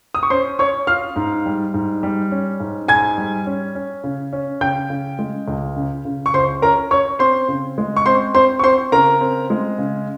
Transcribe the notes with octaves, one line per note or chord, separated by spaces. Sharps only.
D#6
C#6
C#4 C5 C6
C#4 C#5 C#6
F4 F5 F6
G#2
G3
G#2
G3
C#4
G#2
G#2 G#5 G#6
G3
C#4
C#4
C#3
C#4
C#3 G5 G6
C#3
G#3
C#2
C#3
C#3
C#6
C#2 C5 C6
C#4 A#4 A#5
C#4 C#5 C#6
C4 C5 C6
C#3
G#3
C#6
C4 C5 C6
C4 C5 C6
C#6
C4 C5 C6
C#3 A#4 A#5
C4
G#3
C#3